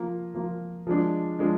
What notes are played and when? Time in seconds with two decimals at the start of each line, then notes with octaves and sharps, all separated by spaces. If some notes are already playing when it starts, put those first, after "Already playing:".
Already playing: F3 A#3 F4
0.34 F3 A#3 F4
0.87 F3 G#3 D4
1.39 F3 G#3 D4